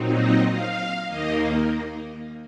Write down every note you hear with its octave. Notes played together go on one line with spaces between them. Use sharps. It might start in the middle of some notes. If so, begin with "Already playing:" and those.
Already playing: A#2 F#3 C4 D#4
D#5
F5
D#2 D#3 A#3 D#5